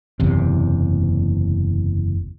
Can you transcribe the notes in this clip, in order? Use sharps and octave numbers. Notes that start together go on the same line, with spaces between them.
F#1 E2 C3